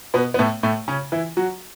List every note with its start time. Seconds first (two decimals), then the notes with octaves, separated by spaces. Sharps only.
0.14 B2 B3
0.34 B3
0.39 A2 A3
0.63 A2 A3
0.88 C#3 C#4
1.12 E3 E4
1.37 F#3 F#4